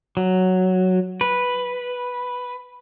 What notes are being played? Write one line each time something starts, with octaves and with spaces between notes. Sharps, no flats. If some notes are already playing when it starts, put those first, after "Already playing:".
F#3
B4